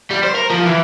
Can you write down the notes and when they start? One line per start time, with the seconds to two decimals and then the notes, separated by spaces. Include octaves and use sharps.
0.11 G3
0.24 C5
0.35 A#4
0.51 F3
0.66 E3